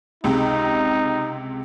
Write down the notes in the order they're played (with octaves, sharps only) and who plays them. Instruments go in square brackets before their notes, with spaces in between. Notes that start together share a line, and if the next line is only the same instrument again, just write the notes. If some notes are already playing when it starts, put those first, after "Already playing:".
[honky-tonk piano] C#2 C3 G#3 [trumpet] D#4